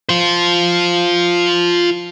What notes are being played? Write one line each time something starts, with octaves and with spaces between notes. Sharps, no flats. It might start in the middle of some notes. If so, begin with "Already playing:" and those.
F4 C5